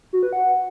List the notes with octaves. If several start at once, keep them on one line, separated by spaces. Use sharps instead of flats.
F#4
B4
F#5